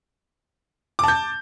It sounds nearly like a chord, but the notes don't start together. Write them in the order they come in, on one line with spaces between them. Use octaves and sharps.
D6 A5 G6